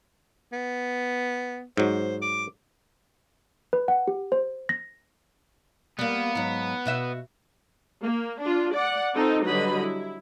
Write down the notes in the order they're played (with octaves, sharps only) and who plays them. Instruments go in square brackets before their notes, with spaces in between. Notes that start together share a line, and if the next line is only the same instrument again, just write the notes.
[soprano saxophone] B3
[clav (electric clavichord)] G#2 F#3 [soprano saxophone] C5
[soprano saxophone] D6
[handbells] B4
F#5
G4
C5
A#6
[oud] G3 A#3 [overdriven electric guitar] B3
[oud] G#2 F#3
B2 F#4 E5
[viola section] A#3
D4 F4
D5 F#5
C4 D#4 F4 A4 C5
D3 F#3 G3 B4 D#5 B5
E4